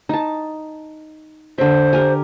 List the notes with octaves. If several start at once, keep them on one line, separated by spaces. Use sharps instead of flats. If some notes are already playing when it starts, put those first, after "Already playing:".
D#4 A5
D3 C5 E5
G4 A#4 G#5